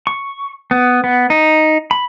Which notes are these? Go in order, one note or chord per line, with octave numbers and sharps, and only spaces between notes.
C#6
B3
B3
D#4
B5